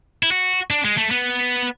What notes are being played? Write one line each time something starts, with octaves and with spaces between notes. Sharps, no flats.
E4
F#4
D4
G#3
A3
B3